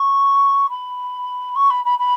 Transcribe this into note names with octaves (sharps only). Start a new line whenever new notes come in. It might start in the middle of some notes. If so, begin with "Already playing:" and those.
Already playing: C#6
B5
C#6
B5
B5
B5